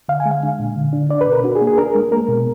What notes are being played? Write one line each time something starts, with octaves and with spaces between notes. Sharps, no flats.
D3 F5
G#5
G#3
F5
D4
A#2
D3
D4
D4 D5
B4
B2
A#4
D4 F#4
G#4
A#3
G#4
D4 A#4
G#3
A#3 A#4
B2